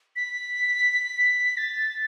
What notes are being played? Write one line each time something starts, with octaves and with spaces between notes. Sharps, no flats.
B6
A6